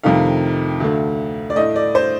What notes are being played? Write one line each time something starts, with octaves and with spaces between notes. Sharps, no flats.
F2 C3 D#3 A3 F5
D2 D3 A3
D5
A2 A3 D#5
D5
C5